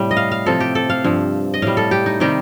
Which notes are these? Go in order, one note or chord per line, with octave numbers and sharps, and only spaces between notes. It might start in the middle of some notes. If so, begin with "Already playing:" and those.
Already playing: A2 C3 G3
D#5
F5
F5
C3 F3 A4
G4
A4
F5
G2 F3
D#5
A2 G3 F5
A4
G4
D#4
C3 D#3 G3 G4